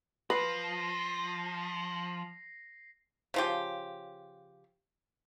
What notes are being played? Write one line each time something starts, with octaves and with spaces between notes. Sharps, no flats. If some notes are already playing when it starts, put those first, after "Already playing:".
F3 B4 A#6 C7
C#3 F3 G4